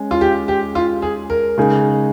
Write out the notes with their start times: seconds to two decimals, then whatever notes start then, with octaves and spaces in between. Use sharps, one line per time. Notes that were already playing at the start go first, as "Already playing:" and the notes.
Already playing: G#3 C#4
0.11 F4
0.21 G4
0.48 G4
0.75 F4
1.02 G#4
1.30 A#4
1.58 C#3 G#3 D#4 G#4